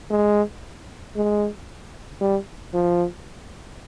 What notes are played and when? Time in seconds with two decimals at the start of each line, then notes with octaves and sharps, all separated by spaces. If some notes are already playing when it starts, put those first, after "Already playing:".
0.10 G#3
1.16 G#3
2.21 G3
2.74 F3